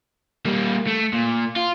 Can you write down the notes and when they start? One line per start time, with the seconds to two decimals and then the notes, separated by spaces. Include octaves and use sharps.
0.46 G3 A#3
0.87 A3
1.13 A#2
1.56 F4